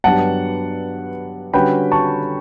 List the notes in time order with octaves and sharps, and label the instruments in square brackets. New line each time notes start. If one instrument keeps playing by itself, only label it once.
[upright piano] G2 F#3 B3 D4 G4 [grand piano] F#5 A5
[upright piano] D3 G3 C#4 F#4 B4 [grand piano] G5 B5
[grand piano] A5 C#6